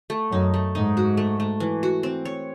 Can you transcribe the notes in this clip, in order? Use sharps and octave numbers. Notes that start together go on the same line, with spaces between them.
A3
F#2 D#4
A3
G#2 D#4
F#4
A3
A3
E3
F#4
C4
C#5